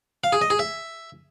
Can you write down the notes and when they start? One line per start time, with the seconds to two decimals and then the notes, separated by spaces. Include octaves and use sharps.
0.24 F5
0.33 G#4
0.41 D#5
0.50 G#4
0.59 E5